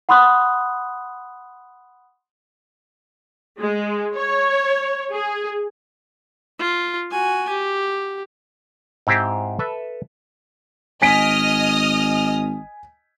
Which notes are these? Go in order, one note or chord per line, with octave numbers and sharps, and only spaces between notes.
F#5 B5 C6 D#6 F#6
G#3
C#5
G#4
F4
F#4 G#5
G4
G#2 C4 E4 G4 C5
A4 B4 E5
G#1 D#5 G#5 D#6 F6 B6 D7